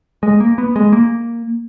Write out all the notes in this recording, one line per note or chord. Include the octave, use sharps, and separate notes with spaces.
G#3
A#3
B3
G#3
A#3